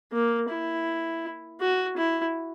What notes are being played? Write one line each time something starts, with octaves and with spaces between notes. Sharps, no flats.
A#3
E4
F#4
E4